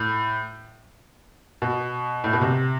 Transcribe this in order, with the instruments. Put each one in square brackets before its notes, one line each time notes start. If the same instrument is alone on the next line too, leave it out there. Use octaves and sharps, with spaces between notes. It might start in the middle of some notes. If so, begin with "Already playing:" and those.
Already playing: [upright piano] A2
B2
A2
B2
C3